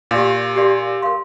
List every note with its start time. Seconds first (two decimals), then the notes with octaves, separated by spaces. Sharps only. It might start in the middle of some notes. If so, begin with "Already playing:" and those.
0.11 A#2 G4 A#4 D5 F5 C6
0.56 G4 A#4 D5 F5 C6
1.02 A#4 F5 C6